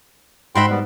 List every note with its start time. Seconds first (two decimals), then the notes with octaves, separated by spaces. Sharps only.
0.55 G#2 F#4 E5 G5 B5 C6
0.70 G3 B3